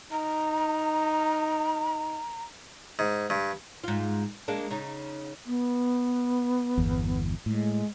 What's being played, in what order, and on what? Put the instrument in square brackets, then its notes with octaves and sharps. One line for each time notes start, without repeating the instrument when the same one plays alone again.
[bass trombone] D#4 [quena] A#5
[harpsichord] G#2
G2
[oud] G#2 F4
G#3 A#3 D4
C#3 D#4
[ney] B3
[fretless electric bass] G1 E2
[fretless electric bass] A2 [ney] G#3